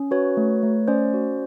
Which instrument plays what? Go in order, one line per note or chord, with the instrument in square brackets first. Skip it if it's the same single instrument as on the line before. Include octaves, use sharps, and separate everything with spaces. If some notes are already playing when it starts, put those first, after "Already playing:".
Already playing: [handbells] C#4
F#4 B4 C#5
A3
A3
C#4 C5 D5
F#4